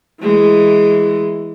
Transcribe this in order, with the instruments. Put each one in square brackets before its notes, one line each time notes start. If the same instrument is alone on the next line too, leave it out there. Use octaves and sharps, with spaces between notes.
[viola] E3 G#3